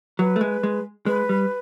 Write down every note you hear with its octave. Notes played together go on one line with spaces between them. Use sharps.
F#3 B4
A3
G#3
G#3
G#3 B4
G3